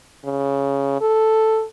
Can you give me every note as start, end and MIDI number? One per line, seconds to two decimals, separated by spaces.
0.25 1.00 49
1.01 1.64 69